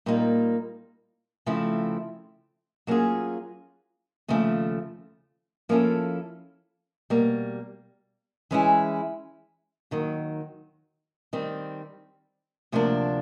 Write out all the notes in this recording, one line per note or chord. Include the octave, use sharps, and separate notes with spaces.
A#2 G3 A#3 D#4
C#3 F3 A3 C4 E4
F#3 A#3 C#4 F4 G#4
D#2 C#3 F3 A3
F3 A#3 C#4 E4 A4
B2 G3 A#3
E3 G#3 C#4 E4 G#4
D#2 D#3 F#3
D#3 G3 C4
D2 C3 F3 A#3 D4